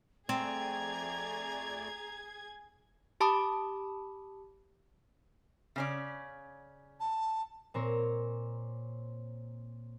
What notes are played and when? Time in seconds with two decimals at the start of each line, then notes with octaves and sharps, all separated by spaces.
0.29 F2 A3 C4 G#4 D5 A#5 G#6
3.20 G4 A5 B5 D6 D#6
5.76 C#3 C#4 D5
7.00 A5
7.74 A#2 C4 A#4 C#5